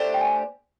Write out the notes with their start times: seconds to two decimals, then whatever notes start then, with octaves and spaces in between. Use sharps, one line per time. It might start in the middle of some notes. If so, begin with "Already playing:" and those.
Already playing: A3 D4 G4 C5
0.14 G5
0.21 G#5